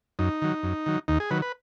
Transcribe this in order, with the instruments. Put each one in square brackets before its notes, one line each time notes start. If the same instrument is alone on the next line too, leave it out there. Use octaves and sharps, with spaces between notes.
[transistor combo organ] F#2 D#4
D#3 F#3
F#2
D#3 F#3
D#2 D#4
G#4
D#3 F#3 B4
B4